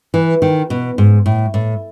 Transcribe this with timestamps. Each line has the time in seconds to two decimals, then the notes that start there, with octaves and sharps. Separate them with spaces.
0.14 E3
0.42 D#3
0.70 B2
0.98 G#2
1.26 A2
1.54 A2